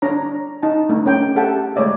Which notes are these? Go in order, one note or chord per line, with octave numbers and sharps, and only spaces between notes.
D4 C#5 A#5
D#4 A5
A3 D4
C#4 A#4 G5
G4 A4 E5 F#5 G5 A5
G#3 A3 C#5 D5 E5